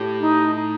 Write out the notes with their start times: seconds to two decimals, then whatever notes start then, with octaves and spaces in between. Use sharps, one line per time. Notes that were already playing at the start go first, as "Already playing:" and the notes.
Already playing: A2 G4
0.19 D#4
0.55 D#4